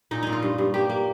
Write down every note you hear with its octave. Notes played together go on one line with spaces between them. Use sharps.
A#2 D#4
A#2 D#4
F4
G2
G2
A#3 G4
A#3